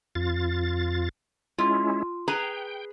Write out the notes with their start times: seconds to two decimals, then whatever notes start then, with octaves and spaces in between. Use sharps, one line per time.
0.15 F2 F4 A6
1.58 G#3 C#4 E4 F4
2.28 G#4 B4 G5 A#5